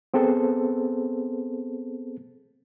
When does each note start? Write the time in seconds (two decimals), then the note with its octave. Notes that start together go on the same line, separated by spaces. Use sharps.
0.14 B3 C4 G#4 A4 C5